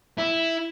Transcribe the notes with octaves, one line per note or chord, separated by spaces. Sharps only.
E4